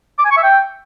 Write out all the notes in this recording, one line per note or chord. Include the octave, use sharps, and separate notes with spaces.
D6
G#5
C#6
E5
G5